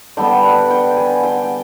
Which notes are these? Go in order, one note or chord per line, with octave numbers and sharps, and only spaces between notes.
D3 G3 B3 G5
F#5
G5
G#5
G5